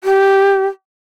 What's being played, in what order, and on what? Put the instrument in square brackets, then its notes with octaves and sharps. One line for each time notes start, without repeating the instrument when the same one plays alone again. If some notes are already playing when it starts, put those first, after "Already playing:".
[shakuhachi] G4